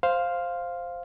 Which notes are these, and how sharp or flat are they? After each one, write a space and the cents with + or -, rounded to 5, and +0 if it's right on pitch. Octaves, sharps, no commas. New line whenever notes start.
C5 +0 F5 +0